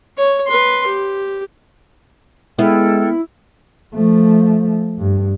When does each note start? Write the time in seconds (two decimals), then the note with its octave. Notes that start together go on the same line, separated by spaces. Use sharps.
0.18 C#5
0.48 B4 C6
0.87 G4
2.59 G#3 B3 E4 A4 G5 F6
3.94 F3 A3
4.99 G2